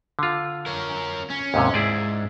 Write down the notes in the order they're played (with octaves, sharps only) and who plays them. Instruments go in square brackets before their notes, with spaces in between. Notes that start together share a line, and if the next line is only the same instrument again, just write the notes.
[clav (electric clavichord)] D3 F4
[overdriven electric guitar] C#4 A#4
C#4
[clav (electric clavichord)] D#2 G#2 C3
[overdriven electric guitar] G#2 [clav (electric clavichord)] E4 G#4 D5